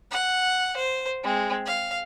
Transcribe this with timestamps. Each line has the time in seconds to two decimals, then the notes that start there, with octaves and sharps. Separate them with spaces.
0.11 F#5
0.77 C5
1.23 G#3 C4
1.66 F5